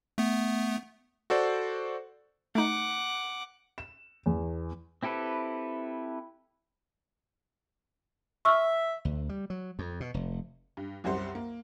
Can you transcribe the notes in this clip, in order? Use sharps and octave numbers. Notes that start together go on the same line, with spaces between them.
A3 B3
F#4 A4 C5 D5
A3 D#4 F#5 D6
E7
E2
C4 E4 G4 A4 B4
E5 C#6 E6 F6
D2
G3
F#3
F2
B2
F1
G2
C2 F#2 G3 C5 F#5 C6
A#3